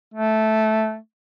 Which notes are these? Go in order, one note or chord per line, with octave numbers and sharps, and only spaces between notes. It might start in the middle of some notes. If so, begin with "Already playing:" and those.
A3